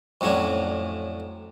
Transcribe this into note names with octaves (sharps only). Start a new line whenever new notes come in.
F2 A2 F#3 C#4 D4